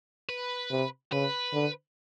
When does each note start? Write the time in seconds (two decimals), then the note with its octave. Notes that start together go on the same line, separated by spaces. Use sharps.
0.29 B4
0.71 C3
1.12 C#3 B4
1.53 D3